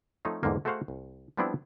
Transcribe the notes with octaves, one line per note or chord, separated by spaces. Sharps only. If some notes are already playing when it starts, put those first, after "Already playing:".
F3 A3 C4 D#4 C#5 F5
E2 G#2 D3 A#3
A3 F#4 G#4 C5 F5 F#5
C2
F3 G3 B3 C4 D4 E4